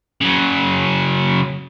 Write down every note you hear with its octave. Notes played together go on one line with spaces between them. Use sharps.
C#3 F#3